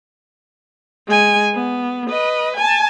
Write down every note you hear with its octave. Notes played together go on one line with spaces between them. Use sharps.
G#3 G#5
B3
B4 D#5
G#5 A5